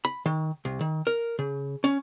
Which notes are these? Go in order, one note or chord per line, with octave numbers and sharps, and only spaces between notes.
B5
D#3
C2
D#3
A#4
C#3
C#4